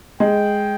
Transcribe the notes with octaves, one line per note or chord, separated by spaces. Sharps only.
G#3 G5